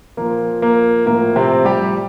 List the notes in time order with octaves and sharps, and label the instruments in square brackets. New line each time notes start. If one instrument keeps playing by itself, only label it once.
[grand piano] A#2 F3 A#3
A#3
A2 F3 A#3
C3 C4
G3 G4